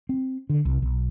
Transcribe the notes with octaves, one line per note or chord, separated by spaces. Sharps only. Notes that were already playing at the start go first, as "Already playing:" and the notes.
C4
D3
C2
B1